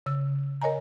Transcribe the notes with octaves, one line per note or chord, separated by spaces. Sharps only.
C#3 E6
A#4 C#5 D#5 G#5 A#5